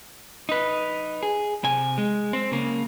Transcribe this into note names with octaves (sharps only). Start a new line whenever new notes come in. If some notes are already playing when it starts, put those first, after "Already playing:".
D#4 B4
G#4
C3 G#5
G#3
C4
C#3 A#3